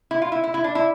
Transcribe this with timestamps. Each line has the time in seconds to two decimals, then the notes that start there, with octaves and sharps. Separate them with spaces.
0.11 E4
0.22 F4
0.32 E4
0.44 E4
0.54 E4
0.64 D4
0.75 E4